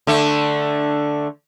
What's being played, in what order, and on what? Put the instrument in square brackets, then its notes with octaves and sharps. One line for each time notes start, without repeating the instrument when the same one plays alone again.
[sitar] D3 A3